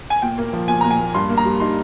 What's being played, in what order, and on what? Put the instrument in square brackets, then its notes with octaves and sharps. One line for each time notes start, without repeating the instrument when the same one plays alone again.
[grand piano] G#5
[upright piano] A#2 [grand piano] G5
[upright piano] A#3
F3
[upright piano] A#2 [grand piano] G#5
[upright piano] A#2 [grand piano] A#5
[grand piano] G#5
[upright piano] A#3
[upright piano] G2 [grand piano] C6
[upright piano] A#3
[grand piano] A#5
[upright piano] G3
[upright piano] D#4 [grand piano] C6